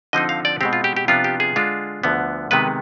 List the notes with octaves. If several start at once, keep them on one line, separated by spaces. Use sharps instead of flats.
D3 F3 C4 D#4 D#5
F5
D5
B2 G#3 C4 G4
F4
G4
G4
C3 F3 B3 D4 F4
G4
G#4
D3 G#3 D4 F4
D2 D3 F3 B3
C3 D#3 G#3 B3 B4